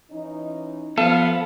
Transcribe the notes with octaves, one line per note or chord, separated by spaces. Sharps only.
E3 C#4 D#4
F3 B3 A4 F5